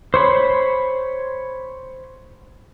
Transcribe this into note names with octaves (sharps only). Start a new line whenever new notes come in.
C5 C#5 B5